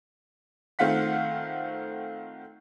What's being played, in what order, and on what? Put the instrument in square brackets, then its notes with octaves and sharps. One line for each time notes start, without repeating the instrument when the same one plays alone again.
[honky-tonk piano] D#3 A3 C4 F4 F#5 B6